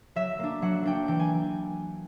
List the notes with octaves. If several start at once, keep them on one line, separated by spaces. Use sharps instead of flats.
F#3 E5
A#3 D4
F#3 F#5
A#3 D4 G5
E3 G5
G#5